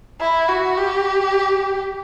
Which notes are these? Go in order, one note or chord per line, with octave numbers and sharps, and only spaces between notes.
E4
F#4
G4